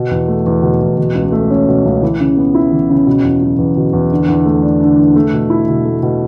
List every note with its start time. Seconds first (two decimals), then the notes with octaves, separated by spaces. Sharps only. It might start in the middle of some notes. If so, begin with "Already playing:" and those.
Already playing: B2
0.11 E2
0.28 A3
0.46 E2
0.63 B2
0.81 E2
0.98 B2
1.15 C#2
1.32 A3
1.51 C#4
1.68 B2
1.85 C#2
2.02 E3
2.20 C#3
2.37 B3
2.55 E4
2.72 E3
2.90 C#3
3.07 B2
3.24 E2
3.41 F#3
3.58 E2
3.77 B2
3.93 E2
4.12 D3
4.28 E2
4.46 A3
4.63 D4
4.81 D3
4.99 E2
5.16 A3
5.33 B2
5.50 E4
5.68 B2
5.85 A3
6.03 B2